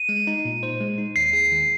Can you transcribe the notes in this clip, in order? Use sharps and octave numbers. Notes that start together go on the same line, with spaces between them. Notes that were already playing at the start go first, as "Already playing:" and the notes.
Already playing: D#7
G#3
D#4
A#2
C5
G#3
D#4
D#2 C7
G#4
D#3